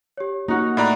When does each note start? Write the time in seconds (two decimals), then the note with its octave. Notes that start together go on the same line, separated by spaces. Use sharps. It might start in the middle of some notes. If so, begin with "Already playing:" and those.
0.17 G4 C#5
0.48 A#3 D#4 F#4 A#4
0.77 A2 D5 E5 A#5 B5 F#6